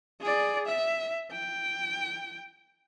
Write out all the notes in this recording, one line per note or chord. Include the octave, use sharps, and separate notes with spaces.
G#4 D5
E5
G5